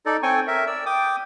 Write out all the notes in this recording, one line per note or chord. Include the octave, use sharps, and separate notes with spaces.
D#4 A4 D5
C4 A4 C#5 G5 G#5 C#6
A#4 E5
D5 E6
G5 D6 D#6